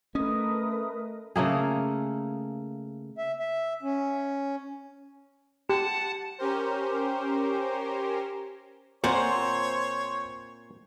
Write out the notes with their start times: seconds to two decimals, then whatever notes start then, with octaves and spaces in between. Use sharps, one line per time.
0.15 A3 C#4 A#4 B4 D#5 D#6
1.36 C#3 A3 A#3 G#4
3.16 E5
3.39 E5
3.83 C#4
5.69 G4 F#5 A5
6.38 C#4 G4 A#4 C5
9.04 A#2 C4 C5 C#5 F#5